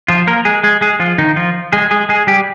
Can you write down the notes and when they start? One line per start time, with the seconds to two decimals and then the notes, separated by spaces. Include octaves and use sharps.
0.08 F3 F4
0.27 A#3 A#4
0.45 G#3 G#4
0.63 G#3 G#4
0.81 G#3 G#4
1.00 F3 F4
1.18 D#3 D#4
1.36 F3 F4
1.73 G#3 G#4
1.91 G#3 G#4
2.09 G#3 G#4
2.27 G3 G4